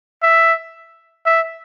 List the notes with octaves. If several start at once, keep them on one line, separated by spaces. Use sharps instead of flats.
E5
E5